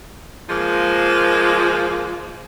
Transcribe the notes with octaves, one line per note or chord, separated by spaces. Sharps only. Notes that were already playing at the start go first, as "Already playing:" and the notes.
F3 G#3 A#3 F4 C5